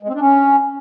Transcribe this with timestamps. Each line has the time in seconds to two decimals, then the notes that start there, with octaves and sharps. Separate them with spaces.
0.03 G#3
0.09 C4
0.14 D4
0.20 C#4